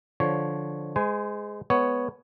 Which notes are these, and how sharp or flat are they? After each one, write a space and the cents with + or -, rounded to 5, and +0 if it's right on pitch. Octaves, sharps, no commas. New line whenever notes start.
D3 +0 F3 +0 C#5 +0
G#3 +0 C5 -40 G#5 +0
G#3 +15 B3 +0 C#5 +5